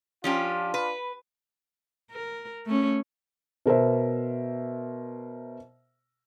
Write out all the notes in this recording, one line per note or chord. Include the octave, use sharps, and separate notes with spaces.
F3 C#4 D4 F4 G4
B4
A#4
A3 C#4
B2 A#4 C5 E5